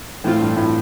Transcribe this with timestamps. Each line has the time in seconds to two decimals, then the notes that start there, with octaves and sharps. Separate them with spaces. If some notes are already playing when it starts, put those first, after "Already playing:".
0.24 A2 E3 A3 C4 F4
0.40 G2
0.56 A2